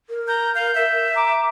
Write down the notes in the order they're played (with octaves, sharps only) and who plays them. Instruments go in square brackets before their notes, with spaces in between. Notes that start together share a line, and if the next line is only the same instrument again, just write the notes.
[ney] A#4
[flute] A#5 [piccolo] G6
[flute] F5 [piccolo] G6
[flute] E5
[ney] A#5 [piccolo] D6